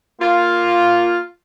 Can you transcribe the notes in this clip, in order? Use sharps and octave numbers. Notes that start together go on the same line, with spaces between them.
A#3 F4